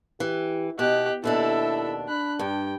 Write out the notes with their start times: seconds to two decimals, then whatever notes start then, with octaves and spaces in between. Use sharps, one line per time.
0.20 E3 G4
0.79 B2 G4 D#5 F#6
1.24 D#2 B2 D4 E4 A4 E5
2.08 D4 B5 F#6
2.39 G2 G5